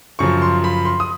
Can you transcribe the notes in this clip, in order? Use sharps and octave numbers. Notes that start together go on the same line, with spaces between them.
F#2 C#3 F3 C#6
C6
B5
C6
D#6